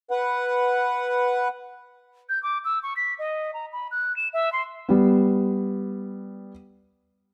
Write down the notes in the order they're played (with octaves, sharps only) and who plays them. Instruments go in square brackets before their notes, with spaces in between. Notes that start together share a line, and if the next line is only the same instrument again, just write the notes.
[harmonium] B4 F#5
[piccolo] G6
D6
E6
C#6
B6
D#5
A#5
B5
F#6
E7
E5
C6
[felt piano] G3 B3